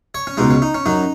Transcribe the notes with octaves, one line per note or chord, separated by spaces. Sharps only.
C#5
C#4
C#2 B2 G#3 D#4
C#4
D#4
C#4
F#2 F#3 D#4